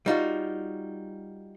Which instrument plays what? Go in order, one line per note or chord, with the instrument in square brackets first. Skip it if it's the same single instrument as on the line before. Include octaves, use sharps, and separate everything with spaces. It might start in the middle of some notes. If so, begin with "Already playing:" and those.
[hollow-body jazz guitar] G3 D#4 F4 F#4